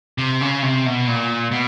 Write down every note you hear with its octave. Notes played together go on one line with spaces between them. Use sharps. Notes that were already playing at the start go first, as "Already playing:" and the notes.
C3
C#3
C3
B2
A#2
B2